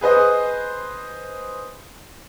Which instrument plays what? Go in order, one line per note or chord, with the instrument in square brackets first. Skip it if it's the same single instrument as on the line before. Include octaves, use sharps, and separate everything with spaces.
[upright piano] G#4 B4 C5 D#5